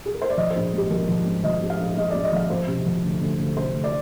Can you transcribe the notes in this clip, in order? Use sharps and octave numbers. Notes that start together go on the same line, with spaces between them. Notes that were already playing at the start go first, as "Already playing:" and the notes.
G#4
A#4
C5
D5
F3 D#5
C5
A#1
G#2 G4
F3 A#4
F3
G#2
F3 D#5
G#2
F5
A#1
G#2 D#5
G#2 D5
D#5
F3 F5
F3 C5
C3
F3
D2
D2
D2
C3 C5
D2
D5